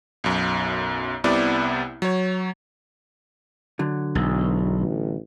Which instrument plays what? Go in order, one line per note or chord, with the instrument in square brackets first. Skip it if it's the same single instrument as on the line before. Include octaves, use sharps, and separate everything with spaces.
[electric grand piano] B1 F#2
C2 C3 B3 E4 D5
F#3 C#5
[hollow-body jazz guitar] D3 F#3
[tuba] E1 [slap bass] B1
[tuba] A1